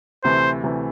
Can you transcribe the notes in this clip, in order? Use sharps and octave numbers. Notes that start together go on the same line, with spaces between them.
D2 C3 E3 A3 E4 C5
D2 C3 E3 A3 E4